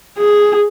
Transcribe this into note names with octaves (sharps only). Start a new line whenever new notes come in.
G#4